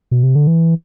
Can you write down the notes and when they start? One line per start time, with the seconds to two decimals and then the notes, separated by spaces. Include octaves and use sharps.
0.11 B2
0.23 C3
0.35 D3
0.47 E3